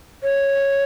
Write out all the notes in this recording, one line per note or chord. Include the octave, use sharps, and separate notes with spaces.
C#5